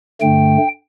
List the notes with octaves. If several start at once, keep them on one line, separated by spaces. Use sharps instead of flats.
G2 D3 A3 G5